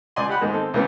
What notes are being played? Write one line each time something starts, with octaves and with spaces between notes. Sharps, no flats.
C#2 D5 D#5 G#5 C6
G4 F#5 B5 F#6
G#2 D#3 G#3 A#3 D#4
C4 A4
C#2 E3 A#3 B3 C#4